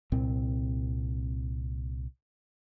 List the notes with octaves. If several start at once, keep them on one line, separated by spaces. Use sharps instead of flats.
C2 A#2 C4